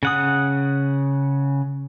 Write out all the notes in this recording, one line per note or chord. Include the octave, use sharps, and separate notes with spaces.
C#3 F#5 D#6